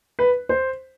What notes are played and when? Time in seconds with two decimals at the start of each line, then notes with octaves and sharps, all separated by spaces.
0.19 B4
0.49 C5